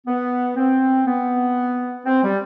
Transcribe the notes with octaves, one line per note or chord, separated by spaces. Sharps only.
B3
C4
B3
C4
G3